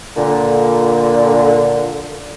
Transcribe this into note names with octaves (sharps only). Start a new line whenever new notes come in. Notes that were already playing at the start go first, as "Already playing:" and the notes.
A#2 D3